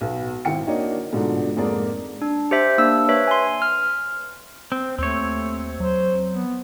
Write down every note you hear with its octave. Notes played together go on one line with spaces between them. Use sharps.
B1 B3 F#4
G#1 D#3 E4 G5 C#7
A#3 D4 D#4 F#4 C#5 D#5
G#2 B2 D3 A3 D4 F4
F2 G#2 A#3 G#4 D5
D4
G4 C5 E5
A#3 D4 E6
B4 C#5 E5
G#5 C6
F6
C4
D#2 A3 C4 C#5
F#3 C5
B3